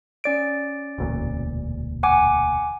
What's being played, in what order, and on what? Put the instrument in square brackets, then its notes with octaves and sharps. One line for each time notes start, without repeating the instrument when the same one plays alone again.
[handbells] C#4 D5 D7
[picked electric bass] E1 D2 A#2
[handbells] F#5 G#5 D6